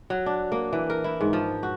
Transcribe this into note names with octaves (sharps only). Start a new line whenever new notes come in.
F#3
D4
A#3
E3
A#4
E4
G#2
F3
F#4